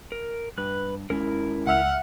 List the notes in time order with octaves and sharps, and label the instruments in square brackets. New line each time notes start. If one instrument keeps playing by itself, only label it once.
[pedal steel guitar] A#4
[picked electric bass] G2 [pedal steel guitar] B4 F#6
[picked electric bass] D#2 G#3 C#4 [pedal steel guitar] E4 A#4
[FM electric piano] C#2 E5 F6 [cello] F#5